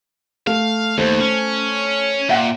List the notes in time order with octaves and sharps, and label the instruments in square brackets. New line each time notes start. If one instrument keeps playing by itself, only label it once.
[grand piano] A3 [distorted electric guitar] F5
[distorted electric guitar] D#2 [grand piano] A3 C5
[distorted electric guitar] C#4
[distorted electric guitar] A#2 [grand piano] E5 F#5 G5